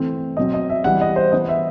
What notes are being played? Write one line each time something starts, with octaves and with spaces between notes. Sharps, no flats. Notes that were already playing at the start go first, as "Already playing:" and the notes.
Already playing: E3 A3 C4
B2 F#3 C4 D#5
D#5
E5
E3 G3 B3 F#5
D#5
C5
E3 B3 D#5
E5